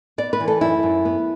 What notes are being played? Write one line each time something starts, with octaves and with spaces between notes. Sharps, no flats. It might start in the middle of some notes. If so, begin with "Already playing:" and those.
B3 D5
B4
E3
A4
F#2 E4
F#2
B3